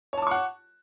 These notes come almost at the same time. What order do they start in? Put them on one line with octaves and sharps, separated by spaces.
C#5 A5 D6 C#6 F#5